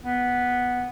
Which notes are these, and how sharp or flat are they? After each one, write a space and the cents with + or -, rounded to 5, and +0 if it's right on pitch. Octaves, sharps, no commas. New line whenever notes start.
B3 -5